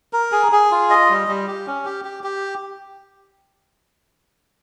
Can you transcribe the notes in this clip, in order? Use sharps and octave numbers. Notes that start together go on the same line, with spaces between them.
A#4
G#4
G#4
F4
D#5
G3
G3
G4
C#4
G4
G4
G4